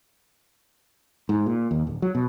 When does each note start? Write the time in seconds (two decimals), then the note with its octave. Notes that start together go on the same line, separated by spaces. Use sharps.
1.29 G#2
1.46 A#2
1.71 D#2
1.87 D1
2.02 F#3
2.15 B2